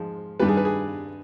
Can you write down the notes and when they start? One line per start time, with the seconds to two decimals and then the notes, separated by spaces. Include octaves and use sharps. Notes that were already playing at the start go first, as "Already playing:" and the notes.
Already playing: G#2 F3 G#3
0.39 G2 D#3 G3 B4
0.48 G#4
0.57 B4
0.65 G#4